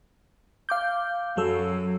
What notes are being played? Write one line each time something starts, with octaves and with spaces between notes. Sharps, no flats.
F5 D6 G6
F#2 F#3 A4 E6